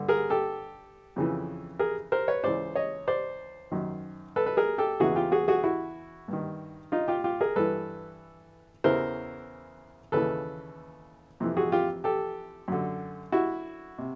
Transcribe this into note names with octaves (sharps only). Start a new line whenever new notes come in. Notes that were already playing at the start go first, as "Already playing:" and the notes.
Already playing: G2 D3
G#4 A#4
G4 A4
F2 C#3 E3
G#4 A#4
A#4 C5
B4 C#5
C#2 C#3 E3 C5 D5
C#5 D#5
C5 D5
F#2 D#3
A4 B4
B4
G#4 A#4
G4 A4
E2 C#3 E3 F#4 G#4
F4 G4
F#4 G#4
F#4 G#4
E4 F#4
G2 D#3
D#4 F4
F4 G4
F4 G4
G#4 A#4
G2 E3 A4 B4
E2 C#3 E3 A#4 C5
D#2 C#3 E3 A4 B4
F2 C3 E3
F#4 G#4
F4 G4
G4 A4
F#2 D3
E4 F#4
C3